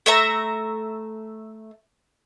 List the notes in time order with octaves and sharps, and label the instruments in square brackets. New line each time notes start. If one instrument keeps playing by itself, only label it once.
[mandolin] A3 E5 A#5